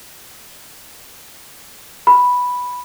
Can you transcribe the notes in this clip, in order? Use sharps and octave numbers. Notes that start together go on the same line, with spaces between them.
B5